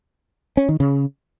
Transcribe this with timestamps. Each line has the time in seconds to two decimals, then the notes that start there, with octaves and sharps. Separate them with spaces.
0.57 C#4
0.69 D#3
0.80 C#3